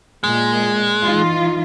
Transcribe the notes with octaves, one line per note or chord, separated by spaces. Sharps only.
A#2 G#3
E3 D#4 F4